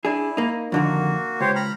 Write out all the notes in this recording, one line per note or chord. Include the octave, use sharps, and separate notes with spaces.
D4 E4 G#4
A#3 D#4
F2 D3 D#3 A#3 F#4
C#2 G4 C5 C#5
A#5 B5 F6